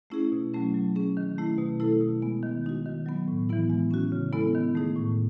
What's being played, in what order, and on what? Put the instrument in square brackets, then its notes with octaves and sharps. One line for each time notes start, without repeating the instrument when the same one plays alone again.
[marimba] A3 C#4 E4 G#4
B2
F#3 A3 C#4
F#3
C#4 G#4
D#3
A3 E4
B2
A3 E4 A4
B2
G#3 B3
D#3
G#3 D#4 F#4
D#3
F#3 B3
A2
E3 B3 E4
G#3
C#4 F#4
C#3
G#3 B3 E4 A4
D#3
A3 D#4 G#4
A2